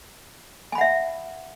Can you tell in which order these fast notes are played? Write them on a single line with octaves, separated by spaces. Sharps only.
G#5 B5 F#5 E5